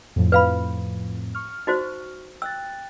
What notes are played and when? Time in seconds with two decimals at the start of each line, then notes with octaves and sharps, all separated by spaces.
0.16 F2 A2 F3
0.32 B4 F5 B5
1.35 C#6 F6
1.67 D#4 F#4 C5
2.42 G5 E6 F#6 A6